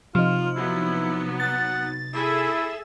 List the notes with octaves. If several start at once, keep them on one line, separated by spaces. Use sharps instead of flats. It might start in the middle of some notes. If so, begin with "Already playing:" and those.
C3 F3 D#4 F4
F#3 B3 E4
F#5 A6
E4 G#4 A4 E5